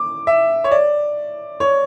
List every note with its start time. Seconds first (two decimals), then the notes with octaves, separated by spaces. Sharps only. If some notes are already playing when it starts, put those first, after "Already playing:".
Already playing: D6
0.27 E5
0.64 C#5
0.71 D5
1.60 C#5